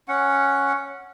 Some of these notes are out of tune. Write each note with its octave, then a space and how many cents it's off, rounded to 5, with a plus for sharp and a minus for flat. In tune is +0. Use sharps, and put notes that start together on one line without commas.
C#4 +0 F#5 -5